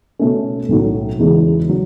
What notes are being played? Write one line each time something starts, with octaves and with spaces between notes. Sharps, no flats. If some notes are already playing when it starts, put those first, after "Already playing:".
B2 A3 C#4
B1 A2 F#3
E2 C#3 E3 G#3
F#3